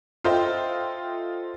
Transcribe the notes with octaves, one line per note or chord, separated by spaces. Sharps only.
F4 A4 C5 D#5 E5 G5